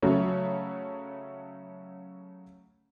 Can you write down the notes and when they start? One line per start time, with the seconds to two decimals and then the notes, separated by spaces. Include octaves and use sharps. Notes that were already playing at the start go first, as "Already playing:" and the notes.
0.02 C#3 F#3 A3 C#4